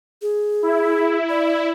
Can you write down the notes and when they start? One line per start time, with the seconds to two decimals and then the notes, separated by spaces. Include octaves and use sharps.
0.22 G#4
0.62 E4
1.29 D5